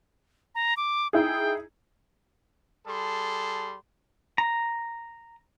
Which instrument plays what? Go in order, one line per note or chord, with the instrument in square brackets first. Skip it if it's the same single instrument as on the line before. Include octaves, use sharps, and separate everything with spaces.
[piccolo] A#5
D6
[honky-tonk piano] D#4 E4 G#4 [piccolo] G5
[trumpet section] G3 G#4 A4 A5 C6
[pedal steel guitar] A#5